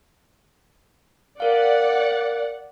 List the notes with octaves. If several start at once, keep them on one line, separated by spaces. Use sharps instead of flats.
A#4 D5 F5 F#5